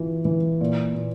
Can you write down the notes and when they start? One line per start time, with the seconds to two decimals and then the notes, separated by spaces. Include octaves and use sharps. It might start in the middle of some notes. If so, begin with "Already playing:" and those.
Already playing: E3 F4
0.25 E3
0.61 A#2
0.95 A#2